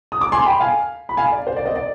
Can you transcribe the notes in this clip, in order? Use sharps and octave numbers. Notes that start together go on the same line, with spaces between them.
D#6
D6
G#5 C6
G5 B5
F5 G#5
B5
F5 G#5
D5
C5
D5
C5 D#5
D5